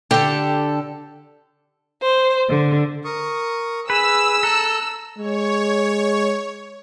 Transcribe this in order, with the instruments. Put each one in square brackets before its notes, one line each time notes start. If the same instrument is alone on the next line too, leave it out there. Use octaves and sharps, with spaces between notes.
[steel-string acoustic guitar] D3 [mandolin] G4 A4
[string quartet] C5
D3
[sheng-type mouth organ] A#4 C#6 D#6
[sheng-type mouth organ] G#4 [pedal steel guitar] B4 [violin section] E6
[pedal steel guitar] A4 [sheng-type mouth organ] A#5 F#6
[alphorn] G#3 [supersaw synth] C#5